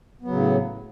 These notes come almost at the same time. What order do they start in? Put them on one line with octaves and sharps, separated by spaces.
B3 F#3 C#3 A2